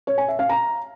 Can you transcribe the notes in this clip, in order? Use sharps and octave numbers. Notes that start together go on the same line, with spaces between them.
C#5
G#5
E5
F5
A#5